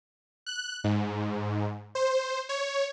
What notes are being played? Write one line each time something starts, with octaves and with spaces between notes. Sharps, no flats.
F#6
G#2
C5
C#5